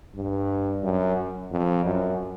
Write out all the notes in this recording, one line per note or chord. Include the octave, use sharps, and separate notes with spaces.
G2
F#2
F2
F#2